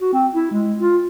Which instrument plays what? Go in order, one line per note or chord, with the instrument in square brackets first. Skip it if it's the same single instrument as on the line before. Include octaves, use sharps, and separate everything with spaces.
[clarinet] F#4
C4
E4
G#3
F4